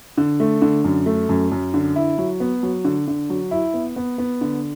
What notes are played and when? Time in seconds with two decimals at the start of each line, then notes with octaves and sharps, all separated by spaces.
0.17 D3
0.40 A3
0.62 D3
0.84 F#2
1.06 A3
1.29 F#2
1.52 F#2
1.74 D3
1.96 E4
2.18 F#3
2.40 B3
2.63 F#3
2.84 D3
3.07 D3
3.30 F#3
3.51 E4
3.74 B3
3.96 B3
4.18 B3
4.41 D3